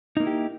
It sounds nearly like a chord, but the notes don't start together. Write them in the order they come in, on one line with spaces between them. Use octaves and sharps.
D#4 A#3 E4 G4